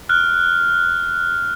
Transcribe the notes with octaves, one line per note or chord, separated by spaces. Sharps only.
F6 F#6